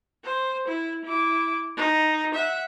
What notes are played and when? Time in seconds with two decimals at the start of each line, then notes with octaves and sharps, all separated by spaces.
0.24 C5
0.68 E4
1.05 E4 D6
1.77 D#4
2.35 E5 F#5